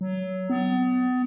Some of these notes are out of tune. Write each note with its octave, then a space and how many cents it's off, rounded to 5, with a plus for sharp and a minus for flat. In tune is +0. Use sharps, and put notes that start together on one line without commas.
F#3 +15
B3 +35